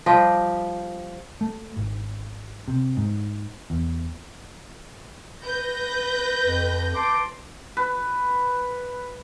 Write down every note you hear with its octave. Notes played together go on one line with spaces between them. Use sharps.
F3 G3 G4 D#5
A3
G#1
C3
G#2
E2
B4 G6 A#6
F2
A5 C6 D6
B4